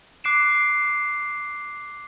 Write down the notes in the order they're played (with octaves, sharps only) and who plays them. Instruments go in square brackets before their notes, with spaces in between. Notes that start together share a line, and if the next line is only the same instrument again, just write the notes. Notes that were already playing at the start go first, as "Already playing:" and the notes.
[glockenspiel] D6 F#6 C7 D7 E7